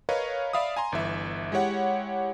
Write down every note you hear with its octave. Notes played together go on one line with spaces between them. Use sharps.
A#4 B4 C#5 D#5 F5
D5 E5 F5 B5 D#6
G#5 A#5 C6
G1 E3 E5
G#3 E4 G4 C#5 F#5